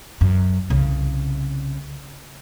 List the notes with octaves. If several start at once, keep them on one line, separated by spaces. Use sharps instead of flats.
F#2
C2 C#3